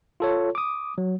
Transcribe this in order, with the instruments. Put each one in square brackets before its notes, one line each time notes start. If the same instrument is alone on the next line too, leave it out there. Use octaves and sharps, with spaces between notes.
[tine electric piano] F4 A4 C#5
D6 D#6
F#3